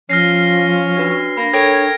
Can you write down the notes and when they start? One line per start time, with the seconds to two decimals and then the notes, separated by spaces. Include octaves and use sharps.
0.10 F3 C#4 F6 A#6 C7
0.97 D4 F#4 B4
1.37 A#3 D4 B5 A#6
1.53 A4 A#4 C#5 G5 G#6 A#6 D7